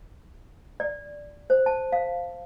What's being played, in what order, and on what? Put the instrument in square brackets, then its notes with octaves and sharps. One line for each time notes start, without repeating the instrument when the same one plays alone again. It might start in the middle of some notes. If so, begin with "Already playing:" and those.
[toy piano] D5
C5
A5
F5